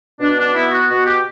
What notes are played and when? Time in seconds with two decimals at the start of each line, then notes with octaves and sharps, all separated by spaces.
0.20 B2 D4
0.38 D4
0.55 B3 E4
0.72 F#4
0.89 B2 F#4
1.06 G4